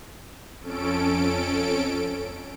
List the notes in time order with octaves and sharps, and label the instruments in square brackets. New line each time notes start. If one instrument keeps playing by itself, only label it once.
[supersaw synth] F2 C#4 A4 D7